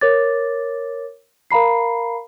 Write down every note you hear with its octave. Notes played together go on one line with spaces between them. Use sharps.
A#4 C#5 D6 A6
A#4 F5 A#5 B5 C7